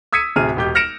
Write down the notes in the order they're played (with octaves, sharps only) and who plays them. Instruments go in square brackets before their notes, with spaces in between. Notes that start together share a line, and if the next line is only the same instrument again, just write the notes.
[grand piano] D#6 E6 G#6 B6 C#7 D#7
D1 C3 G#4 F6 D#7
E1 G4 G6
F6 A#6 C#7 D7 E7 F7